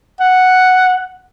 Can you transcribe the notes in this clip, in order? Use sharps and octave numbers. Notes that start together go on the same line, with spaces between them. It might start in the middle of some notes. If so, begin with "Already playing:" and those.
F#5